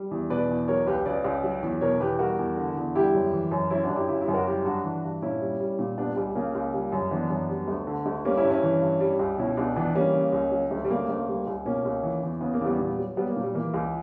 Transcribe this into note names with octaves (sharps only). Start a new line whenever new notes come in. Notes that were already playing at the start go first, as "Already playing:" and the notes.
Already playing: G3
E2
B2 B4 D5
E2
F#3 A#4 C#5
C#2 G4 B4
C#3 B4 D5
C#2
F#3
E2
B2 A#4 C#5
E2 G4 B4
G3 F#4 A#4
E2
D3
E2
G3 E4 G4
F#2
E3
F#2
F#3 C#4 E4
D4 F#4
F#2
E4 G4
C#3 E4 G4
E4 G4
F#2
F#4 A#4
G3 E4 G4
G2 D4 F#4
E3
G2
A#2 C#4 E4
G3
G3
A#2
G3 B3 D4
C#2 G3
C#3 A#3
C#2
G3
F#2
E3 B3 D4
F#2
G3
D2
D3
D2
G3 A#3 C#4
C#4 E4
G2
C#4 E4
E3
G2
G3
C#2
B2 C#4 E4
C#2 B3 D4
E3 B3 D4
G3 A#3 C#4
C#3
C#2
F#3
D2
G3
C#3 A#3
D2
G3
C#2
B2 A#3 C#4
C#2
E3
E2
C#3 B3
A#3
E2 G3 B3
A#2
F#3
F#3 G3 B3
A#3
A#2
G3
E3 A#3
C#2